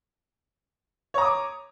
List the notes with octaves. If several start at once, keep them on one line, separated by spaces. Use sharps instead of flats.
C#5 A#5 D6 D#6